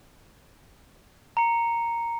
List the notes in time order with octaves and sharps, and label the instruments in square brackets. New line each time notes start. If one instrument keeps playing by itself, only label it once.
[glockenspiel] A#5 C#7